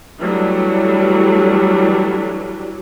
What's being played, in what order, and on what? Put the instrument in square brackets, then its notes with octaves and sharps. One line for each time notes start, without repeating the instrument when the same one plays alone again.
[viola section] E3 F#3 G3 A3 D4